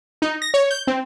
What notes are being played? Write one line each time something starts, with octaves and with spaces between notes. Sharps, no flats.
D#4
A#6
C#5
G6
C4